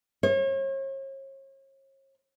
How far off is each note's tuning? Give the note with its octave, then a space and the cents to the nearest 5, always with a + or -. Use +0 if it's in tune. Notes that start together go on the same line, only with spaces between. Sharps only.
C#5 -40